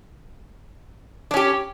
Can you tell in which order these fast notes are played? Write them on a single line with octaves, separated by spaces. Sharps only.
D4 C#4 G4